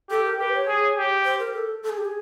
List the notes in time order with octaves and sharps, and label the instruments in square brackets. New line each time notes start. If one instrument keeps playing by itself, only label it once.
[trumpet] G4 [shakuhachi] A4
[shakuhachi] A#4
[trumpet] G4 [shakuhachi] B4
[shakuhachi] C#5
[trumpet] G#4
G4
[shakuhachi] C5
A#4
A4
A4
G#4
G4
G#4